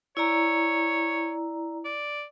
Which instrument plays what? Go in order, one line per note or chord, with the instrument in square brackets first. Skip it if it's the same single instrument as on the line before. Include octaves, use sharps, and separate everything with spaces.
[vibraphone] E4 D5 A#5 [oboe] C#5
[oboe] D5